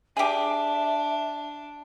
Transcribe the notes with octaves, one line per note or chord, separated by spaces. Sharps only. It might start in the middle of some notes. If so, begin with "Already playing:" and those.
D4 G4 G#4 E5